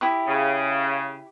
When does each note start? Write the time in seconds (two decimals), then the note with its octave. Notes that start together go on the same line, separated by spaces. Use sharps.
0.01 E4 G4 D#6
0.27 C#3